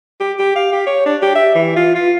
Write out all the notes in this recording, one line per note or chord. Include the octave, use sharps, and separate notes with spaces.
G4
G4
F5
G4
C#5
D4
G4
E5
E3
F4
F4